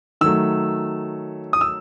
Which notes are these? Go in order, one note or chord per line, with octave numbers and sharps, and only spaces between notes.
D#3 F#3 A3 E6
D#6
E6